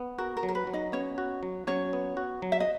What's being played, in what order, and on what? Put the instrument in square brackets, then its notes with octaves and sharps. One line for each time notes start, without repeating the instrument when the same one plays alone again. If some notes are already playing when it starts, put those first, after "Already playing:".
Already playing: [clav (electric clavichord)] B3
[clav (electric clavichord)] F#4 [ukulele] A#4
[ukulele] A#4
[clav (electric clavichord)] F#3
[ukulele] A#4
B4
[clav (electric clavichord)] F#3
[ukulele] D#4 D#5
[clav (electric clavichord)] B3 [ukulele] C#4 C#5
[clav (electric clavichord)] F#4
F#3
[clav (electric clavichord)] F#3 [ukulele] C#4 C#5
[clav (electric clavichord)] B3
F#4
F#3
[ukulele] E5
D#5